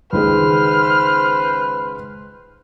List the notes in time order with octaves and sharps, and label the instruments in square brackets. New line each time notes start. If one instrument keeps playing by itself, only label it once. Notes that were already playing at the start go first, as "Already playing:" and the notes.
[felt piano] C#2 D#3 G#3 [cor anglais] B4 [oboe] C5 [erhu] F6